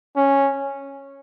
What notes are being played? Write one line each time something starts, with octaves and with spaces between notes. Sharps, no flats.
C#4